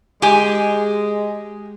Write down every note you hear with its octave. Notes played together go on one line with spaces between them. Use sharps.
G#3 G4 G#5